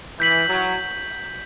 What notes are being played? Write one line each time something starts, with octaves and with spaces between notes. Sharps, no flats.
E3 G6 B6 F#7
F#3